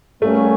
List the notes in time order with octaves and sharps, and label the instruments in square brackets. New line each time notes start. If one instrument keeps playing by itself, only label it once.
[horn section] G3 A#3 C#4 [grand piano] A3